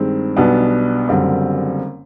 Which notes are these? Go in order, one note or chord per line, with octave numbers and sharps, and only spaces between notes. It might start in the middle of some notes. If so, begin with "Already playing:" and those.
Already playing: G2 D#3 G#3 C4
B1 B2 G3 B3 D4
F#1 F#2 D3 G3 C4